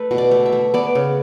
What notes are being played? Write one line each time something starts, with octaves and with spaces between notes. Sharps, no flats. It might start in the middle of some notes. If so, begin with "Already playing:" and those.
Already playing: A3 A4 B4
B2
D5
A3
E5
A3
B3 D5
C#3